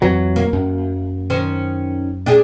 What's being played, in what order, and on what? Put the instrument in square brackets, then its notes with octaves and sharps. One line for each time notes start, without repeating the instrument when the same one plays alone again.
[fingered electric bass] F2 E3 F#3
[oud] A#3
[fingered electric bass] F#2
[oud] D#3 C#4 C5
D4 G4 G#4